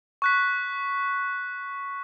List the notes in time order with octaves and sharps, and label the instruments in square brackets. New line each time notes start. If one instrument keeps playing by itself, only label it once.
[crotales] C#6 F#6 B6